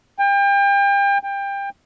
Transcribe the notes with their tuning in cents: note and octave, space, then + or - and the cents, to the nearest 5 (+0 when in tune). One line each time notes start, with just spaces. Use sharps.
G5 +35
G5 +25